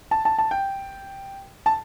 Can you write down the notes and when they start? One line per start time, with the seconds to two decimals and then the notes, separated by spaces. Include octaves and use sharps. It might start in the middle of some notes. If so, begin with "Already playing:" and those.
0.11 A5
0.25 A5
0.38 A5
0.51 G5
1.66 A5